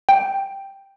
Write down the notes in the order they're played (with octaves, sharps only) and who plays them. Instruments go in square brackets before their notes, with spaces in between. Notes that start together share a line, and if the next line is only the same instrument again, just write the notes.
[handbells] G5